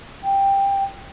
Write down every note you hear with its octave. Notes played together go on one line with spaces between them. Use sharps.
G5